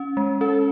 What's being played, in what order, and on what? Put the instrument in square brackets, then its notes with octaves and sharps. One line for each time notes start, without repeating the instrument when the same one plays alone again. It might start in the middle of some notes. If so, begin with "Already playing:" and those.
Already playing: [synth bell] C#4
G#3
[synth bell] C#4 [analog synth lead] A4